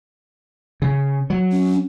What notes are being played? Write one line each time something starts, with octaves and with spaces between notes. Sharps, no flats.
C#3
F#3
C#4